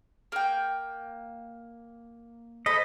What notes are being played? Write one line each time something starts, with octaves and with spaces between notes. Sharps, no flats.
A#3 G5
A4 C5 D#5 B5